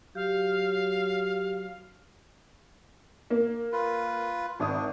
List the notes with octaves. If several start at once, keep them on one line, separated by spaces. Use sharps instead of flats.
F#3 G4 F5
A#3
F4 B4
G#1 D4 E5 D#6